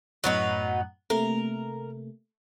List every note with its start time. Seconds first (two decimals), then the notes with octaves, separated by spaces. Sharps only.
0.24 F#2 A2 F#3 B3 D#4 F#6
1.10 C3 A3 A#3 A#4